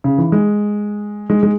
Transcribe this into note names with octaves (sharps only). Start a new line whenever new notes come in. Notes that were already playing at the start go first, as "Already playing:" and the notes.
C#3
E3
G#3
G#3
G#3